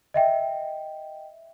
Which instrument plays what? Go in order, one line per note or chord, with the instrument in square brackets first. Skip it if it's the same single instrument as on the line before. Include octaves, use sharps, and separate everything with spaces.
[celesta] D#5 E5 G5